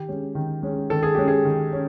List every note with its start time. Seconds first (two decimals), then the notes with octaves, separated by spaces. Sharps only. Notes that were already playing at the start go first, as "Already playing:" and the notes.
Already playing: D#3 G4
0.08 G#3 C#4
0.35 D#3
0.63 G#3 C#4
0.90 D#3 A4
1.03 G#4
1.15 G#3 C#4 G4
1.28 G#4
1.45 D#3
1.73 C#4